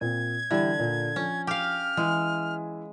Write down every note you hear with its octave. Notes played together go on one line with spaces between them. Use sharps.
A#2 C4 G#6
D3 E3 G3 E4
A#2
F3 C#4
G4 F5 F6
E3 G#3